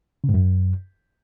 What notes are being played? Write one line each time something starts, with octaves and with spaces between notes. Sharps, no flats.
C#3
G#2
F#2